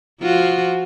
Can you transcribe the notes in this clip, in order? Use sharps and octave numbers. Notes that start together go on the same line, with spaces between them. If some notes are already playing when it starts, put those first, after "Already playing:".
F3 F4 F#4